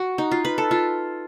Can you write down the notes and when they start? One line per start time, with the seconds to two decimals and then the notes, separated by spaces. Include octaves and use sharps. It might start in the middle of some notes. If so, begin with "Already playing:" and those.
Already playing: F#4
0.18 D#4
0.31 F4
0.45 B4
0.58 A4
0.71 F4